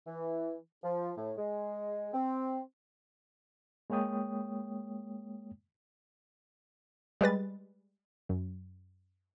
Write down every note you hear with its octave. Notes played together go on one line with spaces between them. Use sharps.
E3
F3
A2
G#3
C4
G#3 A#3 C#5 G5 D#6
G3 G#3 B4 A6
F#2